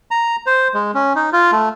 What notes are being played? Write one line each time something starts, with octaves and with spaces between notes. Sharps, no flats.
A#5
C5
G#3
C#4
D#4
F4
A3